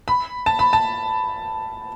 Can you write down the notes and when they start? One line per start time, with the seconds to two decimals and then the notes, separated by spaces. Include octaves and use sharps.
0.08 B5
0.46 A5
0.59 B5
0.73 A5